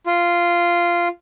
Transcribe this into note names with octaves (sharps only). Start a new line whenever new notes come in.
F4